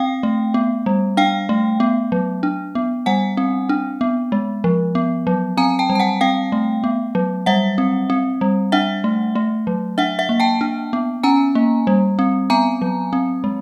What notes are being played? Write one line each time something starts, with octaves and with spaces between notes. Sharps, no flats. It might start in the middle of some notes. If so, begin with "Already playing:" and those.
Already playing: C4 F5 G5
A3
B3
G3
D4 F5 G5
A3
B3
F#3
D4
B3
G3 F#5 G#5
C4
D4
B3
G#3
F3
B3
F#3
C4 G#5 A#5
G5 A5
G3
A5
F#5 G#5
C4 F5 G5
A3
B3
F#3
G3 E5 F#5
C4
C4
G3
D4 E5 F#5
A3
A3
F#3
D4 E5 F#5
E5 F#5
A#3
G5 A5
D4
B3
C#4 G#5 A#5
A#3
G3
C4
B3 G#5 A#5
F#3
C4
G#3